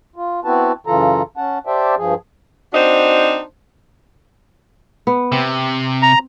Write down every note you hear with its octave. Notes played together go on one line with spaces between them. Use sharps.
F4
B3 C4 E4 F#4 B4 A5
F#2 C#3 E3 F4 A4 A#5
C#4 F#5 A5
G4 C5 D5 E5 G5 A5
G2 F3 G#4
C4 D4 D#4 F#4 C5
B3
C3 C4
A#5